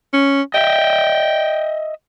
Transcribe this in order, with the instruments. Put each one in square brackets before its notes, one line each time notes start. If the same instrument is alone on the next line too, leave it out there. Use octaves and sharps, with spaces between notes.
[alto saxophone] C#4
[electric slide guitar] D#5 E5 [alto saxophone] G5